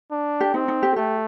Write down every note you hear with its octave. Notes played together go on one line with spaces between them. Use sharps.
D4
G4
C4 D#4
D#4
G4
A3 G4